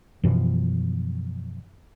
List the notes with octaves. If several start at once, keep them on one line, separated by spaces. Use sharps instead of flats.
F#2 B2 E3 F3